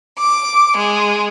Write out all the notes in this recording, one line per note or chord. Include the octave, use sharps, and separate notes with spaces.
D6
G#3